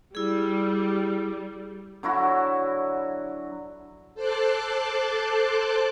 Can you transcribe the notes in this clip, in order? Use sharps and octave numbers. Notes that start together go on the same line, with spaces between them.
G3 E4 G#4
D3 F#3 E4 F#4
A4 C5 A5 C6 D6 F#6